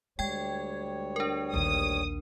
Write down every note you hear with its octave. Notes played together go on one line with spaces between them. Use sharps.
D2 G3 G#3 C#5 G5 G#6
D4 A#4
A#1 D#2 D#6